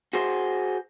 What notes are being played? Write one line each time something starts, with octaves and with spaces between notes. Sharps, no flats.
F#4 G#4 C5